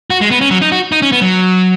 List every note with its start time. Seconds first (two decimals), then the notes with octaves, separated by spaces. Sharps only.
0.10 F#4
0.21 G#3
0.31 B3
0.41 C#4
0.51 F#3
0.61 D#4
0.72 F#4
0.92 D#4
1.02 C#4
1.12 B3
1.21 F#3